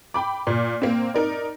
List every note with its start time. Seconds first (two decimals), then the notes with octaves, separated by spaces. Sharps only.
0.14 G5 B5 D6
0.47 A#2
0.82 A#3 C4
1.14 D#4 A#4 D5